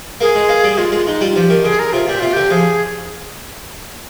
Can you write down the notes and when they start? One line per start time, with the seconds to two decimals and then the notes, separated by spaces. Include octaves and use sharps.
0.21 A#3 G#4
0.35 G#3
0.49 A#3
0.64 G3
0.78 G#3 F4
0.92 G#3
1.07 G#3 D#4
1.21 G3 F4
1.36 F3 G4
1.50 D#3
1.64 D3 G#4
1.79 A#4
1.93 C3 F4
2.08 A#2 G4
2.20 C3 F4
2.33 D3 G4
2.50 F3 G#4